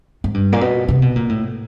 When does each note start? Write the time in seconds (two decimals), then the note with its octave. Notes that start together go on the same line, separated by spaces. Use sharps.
0.24 G#2
0.34 G2
0.52 A#2
0.61 B2
0.88 C3
1.02 B2
1.16 A#2
1.29 A2